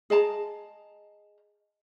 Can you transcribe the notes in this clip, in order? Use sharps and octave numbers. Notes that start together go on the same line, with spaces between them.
G#4 D#5 A5 A#5